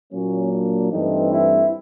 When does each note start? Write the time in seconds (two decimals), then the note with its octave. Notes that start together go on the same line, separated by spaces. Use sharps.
0.13 A#2 F#3 A#3 C#4
0.52 D4
0.92 G2 E3 A3 C4 D#4
1.31 E4